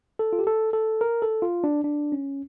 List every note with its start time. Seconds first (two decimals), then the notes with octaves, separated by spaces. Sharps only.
0.19 A4
0.33 F4
0.39 G4
0.47 A4
0.73 A4
1.01 A#4
1.22 A4
1.42 F4
1.64 D4
1.84 D4
2.12 C#4